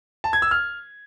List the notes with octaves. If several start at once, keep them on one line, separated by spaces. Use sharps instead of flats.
A5
G#6
E6
F6